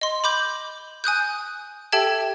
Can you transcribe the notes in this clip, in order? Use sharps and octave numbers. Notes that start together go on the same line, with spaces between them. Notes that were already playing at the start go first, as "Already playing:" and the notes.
D#5 C6
B5 D6 G6 F#7
G#5 D#6 F#6 G6
G4 A4 E5 G5 A5 G#6